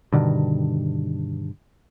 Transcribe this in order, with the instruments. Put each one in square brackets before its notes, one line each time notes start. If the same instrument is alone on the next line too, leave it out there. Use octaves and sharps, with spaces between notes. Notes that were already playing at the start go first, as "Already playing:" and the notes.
[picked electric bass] G2 B2 D3 D#3